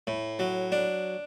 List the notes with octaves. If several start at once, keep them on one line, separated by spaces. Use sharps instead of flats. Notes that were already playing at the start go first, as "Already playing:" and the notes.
A2
F#3
D4